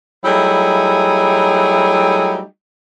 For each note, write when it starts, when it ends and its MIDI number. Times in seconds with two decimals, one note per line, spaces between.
0.25 2.43 54
0.25 2.43 55
0.25 2.43 57
0.25 2.43 63
0.25 2.43 64
0.25 2.43 68